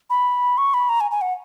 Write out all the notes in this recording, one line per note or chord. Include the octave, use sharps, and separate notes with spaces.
B5
C#6
B5
A#5
G#5
G#5
F#5